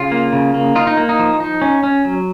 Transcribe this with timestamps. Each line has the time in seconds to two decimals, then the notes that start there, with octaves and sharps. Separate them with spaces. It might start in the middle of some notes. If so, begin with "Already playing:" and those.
Already playing: C#3 F4
0.12 A#3
0.33 C#3
0.54 A#3
0.75 D#4 F4
0.87 D#4
0.97 A#3
1.09 D#4
1.19 F3
1.40 D#4
1.62 C#4
1.84 C#4
2.05 F#3